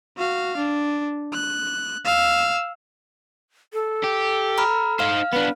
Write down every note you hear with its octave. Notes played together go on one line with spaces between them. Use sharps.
F#4 F5
D4
F#6
F5 E6
A4
G4
A#5 B5 F6
D#4 C5 F5 F6
B3 D4 B4